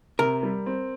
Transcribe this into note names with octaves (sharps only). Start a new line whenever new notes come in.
C3 A#4
G3
C4